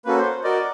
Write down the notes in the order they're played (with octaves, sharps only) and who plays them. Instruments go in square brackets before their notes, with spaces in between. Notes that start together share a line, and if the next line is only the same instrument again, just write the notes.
[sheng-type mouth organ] A#3 C#4 F#4 A4 [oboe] B4
[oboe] C5
[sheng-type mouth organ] F#4 A#4 D#5 [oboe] D5